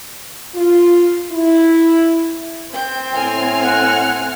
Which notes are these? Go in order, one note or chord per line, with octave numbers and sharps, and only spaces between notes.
F4
E4
C4 G5
A2 G#5 F6
F#5